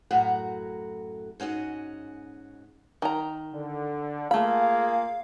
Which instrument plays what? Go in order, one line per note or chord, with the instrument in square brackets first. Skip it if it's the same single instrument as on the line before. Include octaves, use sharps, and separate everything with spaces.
[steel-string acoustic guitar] F#2 A2 F#4 F#5 A#5
G#2 C#4 F#4 D#5
[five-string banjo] D#3 A#5
[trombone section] D3
[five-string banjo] A3 B5 [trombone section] A#3 F4 G#4 [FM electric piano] F5